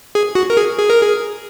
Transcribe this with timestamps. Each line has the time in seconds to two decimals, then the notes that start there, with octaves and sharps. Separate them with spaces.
0.15 G#4
0.35 F#4
0.50 A#4
0.57 G#4
0.78 G#4
0.90 A#4
1.01 G#4